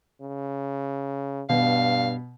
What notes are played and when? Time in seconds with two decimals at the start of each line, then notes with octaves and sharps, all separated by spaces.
0.21 C#3
1.49 G2 B2 F5